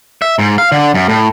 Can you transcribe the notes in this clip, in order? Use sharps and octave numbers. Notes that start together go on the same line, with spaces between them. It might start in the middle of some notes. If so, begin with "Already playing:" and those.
E5
G#2
F5
D3
F#2
A2